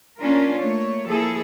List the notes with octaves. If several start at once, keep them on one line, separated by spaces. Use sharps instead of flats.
A#3 C#4 D4 F4 A#4
A3 A#3 C#5
F3 A#3 E4 G#4 A4